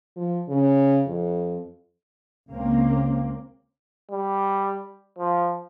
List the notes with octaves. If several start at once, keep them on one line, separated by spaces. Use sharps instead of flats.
F3
C#3
F2
C#2 C#3 A#3 C4
G3
F3